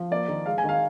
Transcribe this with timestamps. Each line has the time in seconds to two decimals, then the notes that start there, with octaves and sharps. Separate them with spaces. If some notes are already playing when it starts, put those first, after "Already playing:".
Already playing: F3
0.11 A#3 D5
0.28 D#3
0.46 G#3 F5
0.58 G#5
0.64 D#3 F5